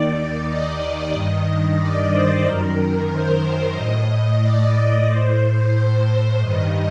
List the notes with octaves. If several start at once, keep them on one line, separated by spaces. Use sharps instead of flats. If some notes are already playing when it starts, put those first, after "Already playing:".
Already playing: D#2 D#3 D5
D#5
G2 D#3
D5
C5
F#2 D#3 A#4
C5
A2 D#5
D5
A2 C5
C5
C5
G2 D#5
D#3